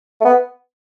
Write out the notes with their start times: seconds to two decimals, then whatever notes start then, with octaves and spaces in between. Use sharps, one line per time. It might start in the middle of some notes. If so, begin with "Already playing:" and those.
0.21 A3
0.25 B3